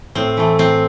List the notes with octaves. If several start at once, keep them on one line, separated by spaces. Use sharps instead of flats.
A2 C4
E3 A3
A2 C4